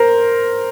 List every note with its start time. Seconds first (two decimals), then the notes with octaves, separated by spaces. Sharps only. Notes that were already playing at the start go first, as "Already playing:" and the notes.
Already playing: A#4 C5